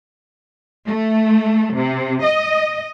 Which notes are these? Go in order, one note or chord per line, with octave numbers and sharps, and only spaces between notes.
A3
C3
D#5